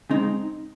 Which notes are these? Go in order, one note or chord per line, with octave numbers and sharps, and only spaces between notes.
C#3 G#3 C4 D#4